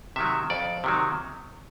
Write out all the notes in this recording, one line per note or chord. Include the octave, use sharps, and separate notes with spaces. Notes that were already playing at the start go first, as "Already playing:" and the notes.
C3 D#3 F#3 E5
F2 D5
C3 D#3 F#3